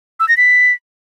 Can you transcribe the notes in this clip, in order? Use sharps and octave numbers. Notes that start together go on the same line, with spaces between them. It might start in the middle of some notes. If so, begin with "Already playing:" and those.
E6
A#6
B6